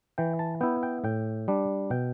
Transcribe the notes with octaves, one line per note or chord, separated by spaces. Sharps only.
E3 G5
A5
B3 E4 G5
G5
A2 G5
G3 D4
B2 G5